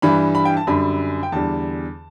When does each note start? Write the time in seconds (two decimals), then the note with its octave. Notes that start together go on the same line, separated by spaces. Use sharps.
0.02 G2 E3 G3 B5
0.35 B5
0.45 G5
0.57 A5
0.67 F#2 D3 G3 B5
1.23 G5
1.32 E2 D3 G3 A5